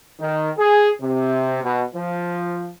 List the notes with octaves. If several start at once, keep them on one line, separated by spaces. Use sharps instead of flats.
D#3
G#4
C3
B2
F3